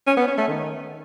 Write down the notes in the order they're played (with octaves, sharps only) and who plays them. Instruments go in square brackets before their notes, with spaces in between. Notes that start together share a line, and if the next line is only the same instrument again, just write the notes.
[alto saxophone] C#4
B3
C#4
A3
D#3